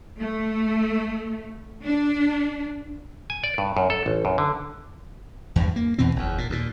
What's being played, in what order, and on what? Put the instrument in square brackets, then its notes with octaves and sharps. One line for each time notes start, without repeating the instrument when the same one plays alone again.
[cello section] A3
D4
[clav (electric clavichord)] G#5
D5
G2
F#2
A4
A1
F#2
D3
[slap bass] E2 G2 G3
A#3
E2 B2 E3 C4
F#1 E2
A#2
D#2 A#2